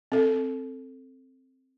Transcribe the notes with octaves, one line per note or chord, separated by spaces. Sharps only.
C4 A4